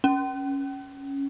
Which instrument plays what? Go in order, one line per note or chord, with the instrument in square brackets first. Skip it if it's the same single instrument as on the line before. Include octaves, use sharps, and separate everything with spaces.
[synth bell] C#4